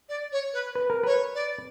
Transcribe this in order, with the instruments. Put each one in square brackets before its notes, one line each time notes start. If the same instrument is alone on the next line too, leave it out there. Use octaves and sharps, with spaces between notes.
[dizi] D5
C#5
B4
[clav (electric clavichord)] B4
A#4
[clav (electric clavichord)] B4 [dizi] C#5
[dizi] D5